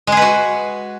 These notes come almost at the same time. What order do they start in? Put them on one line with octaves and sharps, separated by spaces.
G#3 G#4 B4 F#4